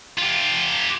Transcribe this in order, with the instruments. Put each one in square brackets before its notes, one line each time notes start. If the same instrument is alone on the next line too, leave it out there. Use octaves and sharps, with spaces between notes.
[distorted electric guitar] F4 G4